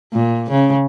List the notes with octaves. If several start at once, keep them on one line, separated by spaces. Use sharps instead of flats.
A#2
C#3